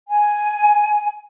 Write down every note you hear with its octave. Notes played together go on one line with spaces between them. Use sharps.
G#5